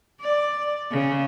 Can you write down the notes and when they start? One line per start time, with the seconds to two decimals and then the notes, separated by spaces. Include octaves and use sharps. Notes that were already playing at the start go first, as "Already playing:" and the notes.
0.21 D5
0.91 C#3